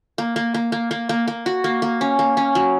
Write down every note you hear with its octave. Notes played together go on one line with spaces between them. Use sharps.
A#3
A#3
A#3
A#3
A#3
A#3
A#3
F#4
A#3
A#3
C#4
A#3
C#4
F#3